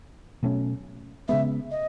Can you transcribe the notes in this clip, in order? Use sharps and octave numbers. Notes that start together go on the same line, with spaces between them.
B2 F#3 A3 C#4
C#3 G#3 B3 E5
D#5